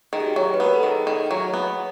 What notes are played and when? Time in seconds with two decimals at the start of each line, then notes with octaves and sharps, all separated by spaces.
0.13 D#3 G#4
0.20 G4
0.26 F#4
0.34 F#3 G4
0.54 B4
0.60 B3 A#4
0.74 A4
0.83 D#3 G#4
1.07 D#3
1.31 F#3
1.54 B3